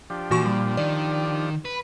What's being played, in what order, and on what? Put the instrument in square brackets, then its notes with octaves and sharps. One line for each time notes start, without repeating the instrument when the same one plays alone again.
[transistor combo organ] F3 D4 G4
[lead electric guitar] A#2 [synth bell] E3 F#4 C#6
[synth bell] G3
[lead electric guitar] D#3 [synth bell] D5
[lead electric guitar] B4 [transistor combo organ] B5